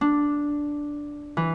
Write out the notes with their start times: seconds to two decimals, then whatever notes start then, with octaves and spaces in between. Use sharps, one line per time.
0.01 D4
1.37 E3